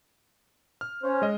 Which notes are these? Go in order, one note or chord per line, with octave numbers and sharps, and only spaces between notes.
F6
C#4 C5
G#3 D#5